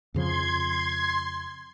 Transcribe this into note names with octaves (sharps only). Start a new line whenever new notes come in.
F2 C#3 F3 C6 G#6